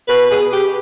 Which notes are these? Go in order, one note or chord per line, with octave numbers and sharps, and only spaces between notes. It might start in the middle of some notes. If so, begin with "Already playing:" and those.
B2 B4
B2 G#4
B2 G4